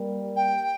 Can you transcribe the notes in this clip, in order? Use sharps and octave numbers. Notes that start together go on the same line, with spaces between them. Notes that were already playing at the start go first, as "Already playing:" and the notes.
Already playing: G3 A#3
G5